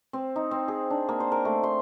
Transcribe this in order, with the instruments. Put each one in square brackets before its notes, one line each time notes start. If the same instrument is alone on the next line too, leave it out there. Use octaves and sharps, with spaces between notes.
[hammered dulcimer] C4
D#4
C4
G#4
D4
A#3
C5
A#4
A3
C6